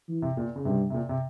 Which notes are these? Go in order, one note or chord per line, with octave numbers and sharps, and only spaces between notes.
E3
C3
A#2
C#3
G2 C3
C3
A#2
C3